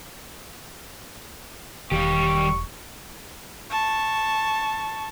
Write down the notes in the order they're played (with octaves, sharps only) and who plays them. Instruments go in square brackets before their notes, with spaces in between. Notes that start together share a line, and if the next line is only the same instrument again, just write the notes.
[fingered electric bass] E1 [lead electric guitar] D#3 F5 [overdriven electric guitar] G3 G4 [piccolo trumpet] C#6
[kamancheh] A5 C#6